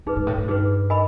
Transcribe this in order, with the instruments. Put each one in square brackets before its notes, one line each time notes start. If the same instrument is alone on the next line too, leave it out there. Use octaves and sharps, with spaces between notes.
[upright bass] G2 [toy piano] D#4 G#4 B4
[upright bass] G#2
A2
A2
[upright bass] G2 [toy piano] D#4 G#4 B4
[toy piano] A#4 D#5 G#5 B5